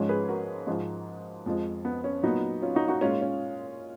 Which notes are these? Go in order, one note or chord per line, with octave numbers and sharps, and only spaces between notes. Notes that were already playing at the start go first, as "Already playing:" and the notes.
Already playing: G#2 F3 G#3 C#4
G#4 B4
F#4 A#4
G#2 F3 G#3
F2 F3 G#3
B3
C#4
A#2 F#3 B3 D#4
C#4 F4
D#4 F#4
D#4 F#4
A#2 G#3 C#4 F4
C#4